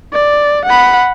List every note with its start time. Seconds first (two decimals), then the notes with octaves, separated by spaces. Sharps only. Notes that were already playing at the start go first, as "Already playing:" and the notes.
0.13 D5
0.65 F#5 B5